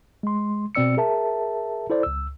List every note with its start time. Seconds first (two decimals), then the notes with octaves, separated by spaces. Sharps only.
0.23 G#3 C6
0.75 B2 C4 D5 E6 C#7
0.97 G#4 A#4 E5 A5
1.90 E4 A4 C5 D5
2.03 C#2 E6